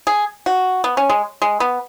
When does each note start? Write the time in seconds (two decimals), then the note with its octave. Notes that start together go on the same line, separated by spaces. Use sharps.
0.07 G#4
0.46 F#4
0.84 B3
0.97 C#4
1.09 G#3
1.42 G#3
1.60 B3